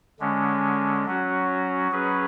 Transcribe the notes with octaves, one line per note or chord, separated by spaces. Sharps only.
D3 G#3 C#4
F#3 C#4 F#4
F#3 C#4 G#4 B4